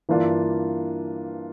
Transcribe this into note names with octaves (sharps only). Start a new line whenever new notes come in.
G2 E3 A#3 D4 F4